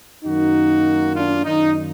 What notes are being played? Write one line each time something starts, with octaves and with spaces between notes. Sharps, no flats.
F#2 D#3 A#3 D#4 F#4
D4 F4
F#2 D#3 A#3 D#4